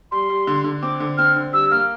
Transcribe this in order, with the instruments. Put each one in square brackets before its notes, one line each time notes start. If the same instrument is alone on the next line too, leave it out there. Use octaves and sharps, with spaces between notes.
[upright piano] G3 [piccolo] C6
[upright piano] G3
D3
D3
[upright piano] C4 [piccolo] D6
[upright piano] D3
[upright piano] C4 [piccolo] F6
[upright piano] D3
[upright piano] G3 [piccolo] E6
[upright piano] A#3 [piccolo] F6